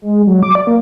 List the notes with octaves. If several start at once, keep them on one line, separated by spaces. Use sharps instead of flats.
G#3
F#3
D6
D5
A#3